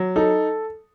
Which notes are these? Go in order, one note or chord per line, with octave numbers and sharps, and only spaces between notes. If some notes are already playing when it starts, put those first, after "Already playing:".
Already playing: F#3
D#4 A4